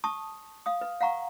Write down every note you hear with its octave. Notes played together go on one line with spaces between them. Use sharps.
A5 C#6 D#6
F5 D#6
B4
F5 F#5 A#5 C#6